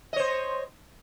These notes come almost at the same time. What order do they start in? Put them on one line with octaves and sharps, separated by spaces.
D#5 C#5 C5